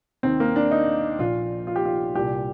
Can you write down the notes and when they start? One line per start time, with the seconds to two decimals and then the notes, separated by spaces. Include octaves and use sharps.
0.23 D#2 D#3 C4
0.40 A#3
0.56 D4
0.71 D#4
1.19 A#1 A#2 F4
1.67 F4
1.76 G4
1.85 F4
2.15 C2 A#2 G4